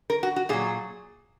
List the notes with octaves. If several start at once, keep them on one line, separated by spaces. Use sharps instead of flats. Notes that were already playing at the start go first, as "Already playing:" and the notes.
A#4
F#4
F#4
A#2 F#3 G#4